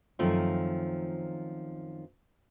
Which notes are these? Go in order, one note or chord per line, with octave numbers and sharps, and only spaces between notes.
F#2 D#3 F3 A3 C4 F4